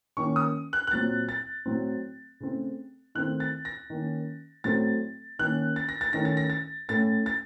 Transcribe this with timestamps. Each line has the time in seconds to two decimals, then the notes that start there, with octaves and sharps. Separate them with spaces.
0.17 D#3 A#3 C#4 C#6
0.36 D#6
0.73 F#6
0.87 F#6
0.91 A#2 F#3 C4 A6
1.29 A6
1.66 A2 F#3 C4
2.40 C#3 A3 C4
3.15 D#3 A3 C4 F#6
3.40 A6
3.65 A#6
3.90 D#3 A#3 C#4
4.64 A2 F#3 A3 C4 A6
5.39 D#3 A#3 C#4 F#6
5.76 A6
5.89 A#6
6.01 A6
6.13 D#3 A3 C#4 A#6
6.25 A6
6.37 A#6
6.50 A6
6.89 A2 A3 C#4 A6
7.26 A6